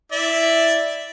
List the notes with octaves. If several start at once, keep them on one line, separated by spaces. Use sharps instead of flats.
E4 D5 E5